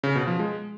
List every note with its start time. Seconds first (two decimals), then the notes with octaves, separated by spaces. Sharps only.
0.03 C#3
0.15 B2
0.27 F3
0.39 G#3